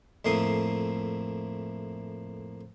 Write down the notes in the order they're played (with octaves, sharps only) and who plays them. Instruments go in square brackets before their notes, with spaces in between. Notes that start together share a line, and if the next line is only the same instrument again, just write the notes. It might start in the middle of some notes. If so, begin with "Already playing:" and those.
[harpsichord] F2 A2 A#3 C6 D#6